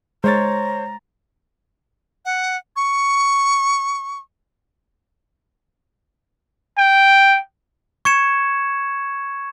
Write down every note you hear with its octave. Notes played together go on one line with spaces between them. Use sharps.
G#3 C5 C#5 A#5 A6
F#5
C#6
G5
C#6 G#6 C#7 E7